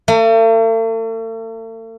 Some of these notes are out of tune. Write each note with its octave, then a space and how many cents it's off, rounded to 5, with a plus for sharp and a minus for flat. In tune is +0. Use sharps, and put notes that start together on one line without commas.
A3 +45